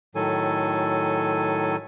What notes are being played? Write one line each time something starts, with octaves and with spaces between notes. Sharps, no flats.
A2 D#3 F#3 A4 G#5